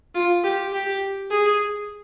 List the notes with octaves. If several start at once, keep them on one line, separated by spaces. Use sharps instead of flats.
F4
G4
G4
G#4